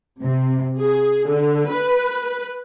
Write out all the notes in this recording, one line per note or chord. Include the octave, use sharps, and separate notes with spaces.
C3
G#4
D3
B4